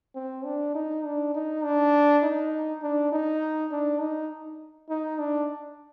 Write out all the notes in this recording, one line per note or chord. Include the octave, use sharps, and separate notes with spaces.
C4
D4
D#4
D4
D#4
D4
D#4
D4
D#4
D4
D#4
D#4
D4